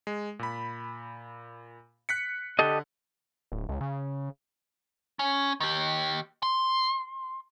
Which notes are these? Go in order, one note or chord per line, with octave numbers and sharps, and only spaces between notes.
G#3
A#2 B5
F#6 B6 C#7
D3 G4 A4 D#5
D1
C#2
C#3
C#4
D#3 G4
C6